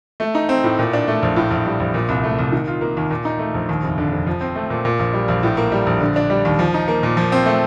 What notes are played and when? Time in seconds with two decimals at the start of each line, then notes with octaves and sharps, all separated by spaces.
0.20 A3
0.35 D#4
0.49 C4
0.64 A2
0.79 A#2
0.93 D4
1.08 A3
1.23 A#1
1.36 A2
1.51 A#1
1.66 G3
1.80 A#1
1.94 A#2
2.09 C2
2.24 A3
2.39 C2
2.52 D#3
2.67 F4
2.81 A#3
2.97 D#2
3.11 A#2
3.25 D#4
3.39 A3
3.54 A#1
3.69 D#2
3.83 F1
3.98 D3
4.12 F1
4.27 F3
4.41 C4
4.55 A3
4.70 A#2
4.85 A#2
4.99 A#1
5.13 G3
5.28 A#1
5.43 A2
5.57 A#3
5.72 G3
5.87 A#1
6.01 D3
6.16 D4
6.30 G3
6.45 D#2
6.59 F3
6.74 D#4
6.88 A#3
7.03 A#2
7.17 F3
7.32 C4
7.46 A3